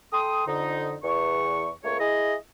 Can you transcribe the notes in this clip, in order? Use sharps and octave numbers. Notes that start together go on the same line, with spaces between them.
A4 G5 C6 D#6
F2 D3 D#4
E2 C#6
C#2 A3 A#3 C#5
E4 G#4 D#5